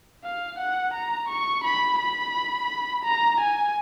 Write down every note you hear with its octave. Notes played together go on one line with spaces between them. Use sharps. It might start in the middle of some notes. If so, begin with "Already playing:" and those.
F5
F#5
A#5
C#6
B5
B5
A#5
G#5